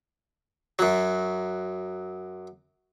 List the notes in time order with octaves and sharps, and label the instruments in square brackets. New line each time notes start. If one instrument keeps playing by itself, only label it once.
[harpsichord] F#2 F#3